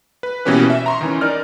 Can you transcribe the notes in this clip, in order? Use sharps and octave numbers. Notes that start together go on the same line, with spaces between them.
B4
B2 E3 A#3 C#4 G4 B4
E5
A#5 C6 C#6
D#3 E3 C#4
D#4 A#4 D5 F6